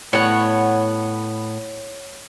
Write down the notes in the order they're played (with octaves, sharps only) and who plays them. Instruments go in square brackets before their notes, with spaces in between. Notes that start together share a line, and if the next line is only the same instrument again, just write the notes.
[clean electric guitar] A2 B3 [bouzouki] C#5 F#5